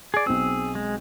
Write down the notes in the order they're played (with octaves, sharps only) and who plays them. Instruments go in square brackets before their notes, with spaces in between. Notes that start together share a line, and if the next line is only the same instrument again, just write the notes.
[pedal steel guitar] G#4 D5
[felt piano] B1 C4 [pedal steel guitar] G#4 E6
[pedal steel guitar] G#3